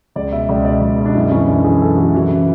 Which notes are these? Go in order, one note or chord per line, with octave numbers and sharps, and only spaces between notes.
C#2 D5
B2 E5
C#2 D5
B2 D5
C#2
B2
D4
F#2 E4
E3 C#4
F#2 D4
E3 G#4
F#2 A4
E3 F#4
E3 F#4
C#3